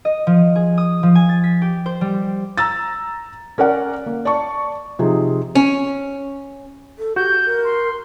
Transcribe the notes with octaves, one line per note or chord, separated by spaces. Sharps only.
D#5
F3
G#4
D#6
F3
G#5
A6
B6
G4
C5
G3
A#5 E6 A6
C#4 A#4 D5 F#5
A#3
D5 A5 C#6
C3 F3 D#4 G#4
C#4
A4
F#4 G4 G6
A#4
C6